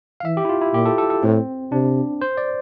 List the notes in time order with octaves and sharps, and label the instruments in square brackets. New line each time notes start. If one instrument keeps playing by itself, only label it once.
[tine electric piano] F5
[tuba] E3 [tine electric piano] E5
[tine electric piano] G4
E4
F4
E4
[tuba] A#2 [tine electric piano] G4
[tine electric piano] A4
A4
A4
[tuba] A2 [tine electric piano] C4
[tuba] C3 [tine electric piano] D4
[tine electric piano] C5
D5